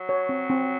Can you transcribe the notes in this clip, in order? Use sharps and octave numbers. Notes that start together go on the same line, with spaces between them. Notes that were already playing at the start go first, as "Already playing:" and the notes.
Already playing: F#3
C#5
C4
C4